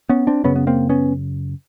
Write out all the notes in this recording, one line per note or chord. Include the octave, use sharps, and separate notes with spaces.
B3 C#4
C4 D4
F#2 C#3 B3 C#4
B3
A#3 C4
B3 C#4